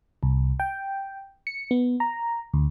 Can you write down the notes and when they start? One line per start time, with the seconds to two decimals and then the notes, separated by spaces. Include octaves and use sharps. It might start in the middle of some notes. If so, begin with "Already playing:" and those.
0.23 C2
0.60 G5
1.47 C#7
1.71 B3
2.00 A#5
2.54 D2